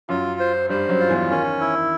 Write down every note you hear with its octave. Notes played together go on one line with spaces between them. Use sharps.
F#2 F#3 F4
C5
G2 G3 C5
F#2 F#3
F4
E2 E3
D#3 C#4
E4